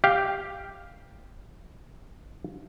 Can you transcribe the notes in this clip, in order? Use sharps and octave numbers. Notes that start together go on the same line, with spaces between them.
G4 F5